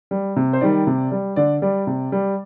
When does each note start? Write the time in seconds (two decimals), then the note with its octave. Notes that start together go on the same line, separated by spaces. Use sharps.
0.11 G3
0.36 C3
0.53 C5
0.61 D#3 G3 D5
0.87 C3
1.12 G3
1.36 D3 D5
1.62 G3 D5
1.87 C3
2.12 G3